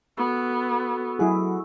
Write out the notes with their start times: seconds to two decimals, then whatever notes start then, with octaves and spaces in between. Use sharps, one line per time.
0.18 B3 F#4 A4
1.19 F#3 E4 G#4 F#5 B5